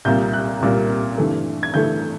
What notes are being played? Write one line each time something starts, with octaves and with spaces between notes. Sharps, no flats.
C2 A#2 G3 A#3 G6
F#6
C2 A#2 G3 A#3
G2 E3 A3
G#6
G2 E3 A3 G6